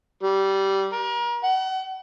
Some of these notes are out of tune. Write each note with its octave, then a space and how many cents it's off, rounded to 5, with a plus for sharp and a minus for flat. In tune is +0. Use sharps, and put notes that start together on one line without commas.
G3 -15
A#4 +35
F#5 +35